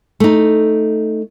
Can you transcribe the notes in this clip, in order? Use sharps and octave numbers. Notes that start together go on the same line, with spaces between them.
A3 D#4